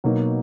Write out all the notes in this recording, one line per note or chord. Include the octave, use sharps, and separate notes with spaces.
B2 F#3 A#3 D#4